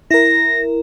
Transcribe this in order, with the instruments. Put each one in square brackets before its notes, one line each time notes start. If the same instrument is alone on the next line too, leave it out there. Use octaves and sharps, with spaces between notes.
[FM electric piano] E4 A#4 [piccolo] A#6